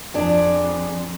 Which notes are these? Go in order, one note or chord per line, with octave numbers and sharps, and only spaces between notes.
F2 D4 G#4